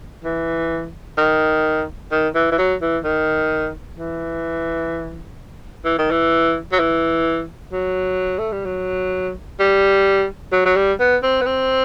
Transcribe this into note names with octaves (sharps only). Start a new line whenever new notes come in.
E3
D#3
D#3
E3
E3
F#3
E3
D#3
E3
E3
D#3
E3
F#3
E3
F#3
A3
G3
F#3
G3
F#3
F#3
G3
B3
C4
B3
C4